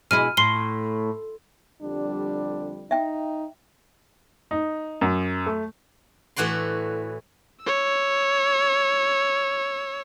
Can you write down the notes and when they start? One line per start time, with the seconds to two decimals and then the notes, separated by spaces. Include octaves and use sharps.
0.11 B2 G#3 E4 F6 D#7
0.37 A2 C6 C7 G7
1.82 F2 D3 G3 D4
2.91 D#4 E5 G5
4.51 D#4
5.01 F#2
5.46 A3
6.36 A2 E3 F#4 D5 C6
7.63 C#5 E6